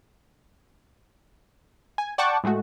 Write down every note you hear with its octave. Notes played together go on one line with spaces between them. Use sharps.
G#5
D5 F#5 G5 A5 C#6 D6
A2 G#3 A3 F#4